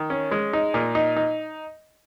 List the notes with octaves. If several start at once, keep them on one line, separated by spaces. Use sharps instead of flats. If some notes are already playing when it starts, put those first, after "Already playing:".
Already playing: D#3
C#4
G#3
D#4
A#2
D#4
D#4